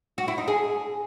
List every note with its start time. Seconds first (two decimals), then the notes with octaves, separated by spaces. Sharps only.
0.18 F#4
0.28 E4
0.38 D#4
0.48 G#4